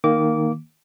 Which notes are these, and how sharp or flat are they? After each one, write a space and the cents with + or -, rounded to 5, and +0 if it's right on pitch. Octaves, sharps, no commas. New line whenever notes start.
D#3 +0 A#3 +0 D6 -20